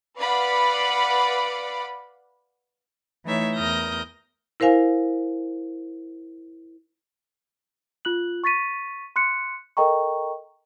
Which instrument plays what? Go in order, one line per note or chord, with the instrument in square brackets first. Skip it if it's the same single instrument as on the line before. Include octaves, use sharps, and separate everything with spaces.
[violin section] B4 D5 F5 F#5 B5
[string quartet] E3 A3 D#4 C#5 E5
E2 A#4 D#6 F6 G6 A#6
[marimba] E4 A#4 C5 F5 G#5
[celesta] F4 F#6 F#7
C#6 A6 B6 D#7
C6 F#6 C#7
A4 A#4 D#5 G5 A#5 C#6